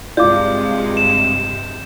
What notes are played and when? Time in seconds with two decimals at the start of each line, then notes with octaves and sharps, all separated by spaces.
0.17 G2 C3 G#3 F4 D5 D6 G6
0.97 E7